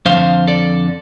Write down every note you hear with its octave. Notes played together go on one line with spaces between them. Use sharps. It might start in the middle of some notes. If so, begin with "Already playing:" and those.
F2 D3 F3 C5 F5
A4 D5